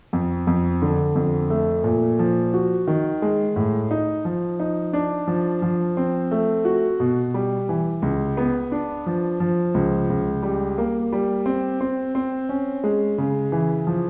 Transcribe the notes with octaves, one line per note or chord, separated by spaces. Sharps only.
F2
F2
D3
F2
A3
A#2
F3
F#4
D#3
G#3
A2
D#4
F3
D#4
D4
F3
F3
C4
A3
F#4
B2
G3
E3
C#2
B3
D4
F3
F3
C#2
C#2
G3
A#3
G3
C4
C4
C4
C#4
G#3
C#3
E3
F3